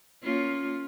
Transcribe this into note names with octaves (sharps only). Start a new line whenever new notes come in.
A#3 C#4 F4